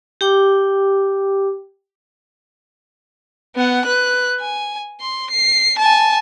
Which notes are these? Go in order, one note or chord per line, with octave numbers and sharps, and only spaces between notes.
G4 G5 D6
B3 F#5
B4 F#6
G#5
C6
C7
G#5 A5